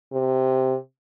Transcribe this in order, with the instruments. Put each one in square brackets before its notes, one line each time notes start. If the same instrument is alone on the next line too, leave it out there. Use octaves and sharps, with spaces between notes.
[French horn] C3